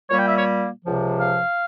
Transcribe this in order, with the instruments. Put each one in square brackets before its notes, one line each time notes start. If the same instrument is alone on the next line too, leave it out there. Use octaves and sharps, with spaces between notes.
[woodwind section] A#2 G3 A#3 C#5
G5
E5
C#5
C#2 C3 F3
F5